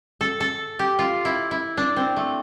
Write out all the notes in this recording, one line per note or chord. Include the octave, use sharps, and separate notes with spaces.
A4
A4
G4
F4
E4
E4
D4
C4
A3